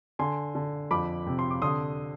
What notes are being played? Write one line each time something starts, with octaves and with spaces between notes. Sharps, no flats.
D3 G#5 C6
D3
F2 B5 D6
C3
C6
D6
D3 C6 D#6